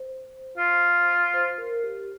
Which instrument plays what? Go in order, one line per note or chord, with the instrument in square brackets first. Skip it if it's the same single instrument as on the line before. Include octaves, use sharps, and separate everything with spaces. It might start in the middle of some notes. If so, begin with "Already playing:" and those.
Already playing: [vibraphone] C5
[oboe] F4
[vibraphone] C5
A#4
G4